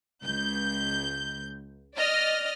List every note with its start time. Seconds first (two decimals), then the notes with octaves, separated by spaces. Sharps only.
0.23 C#2 G6
1.96 D5 D#5 F6